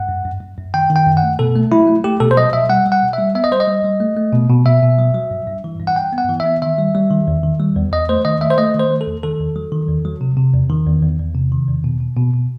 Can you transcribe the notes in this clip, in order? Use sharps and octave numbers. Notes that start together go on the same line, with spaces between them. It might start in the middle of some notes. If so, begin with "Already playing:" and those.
Already playing: G2 F#5
F#2
F#2
F#2
F#2
D#3 G5
D#3
G5
F#2
F#5
A3
B2 A4
A3
F#3 E4
A3
A3 G4
B2 A4
C5
F#3 D#5
B2 E5
G3 F#5
G3
F#5
B2
E5
G3
B3 E5
D#5
G3 C5
D#5
G3
G3
A3
A3
B2
B2
B2 E5
B2
F#3
F#3
G2
G2
E3
G2
F#5
G2 G5
B3
F#5
E3
E5
B3
D#3 E5
G3
G3
D#3
E2
D#3
G3
E2
E2 D#5
A3 C5
D#3 D#5
A3 E5
C5
A3 D#5
D#3
C5
A3
A4
E2
D#3 A4
E2
F#3
D#3
E2
F#3
C3
C3
E2
D#3
E2
E2
E2
C3
D#3
E2
B2
B2
B2
B2